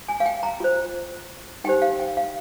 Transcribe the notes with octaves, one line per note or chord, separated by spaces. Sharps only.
G#5
F5
G5
A#5
F4 C5
D#4 G4 C5 G5
F5
G5
F5